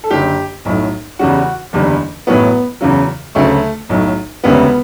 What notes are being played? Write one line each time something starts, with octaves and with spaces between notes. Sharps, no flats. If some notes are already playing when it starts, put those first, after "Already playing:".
A4
F#1 F#2 D3 G4
B1 A2 F#3
E2 C#3 G3 F#4
F#1 E2 D3 G3
A1 A2 F#3 B3
E2 C#3 F#3
D2 C#3 F#3 A3
B1 A2 F#3
E1 D2 C#3 G3 B3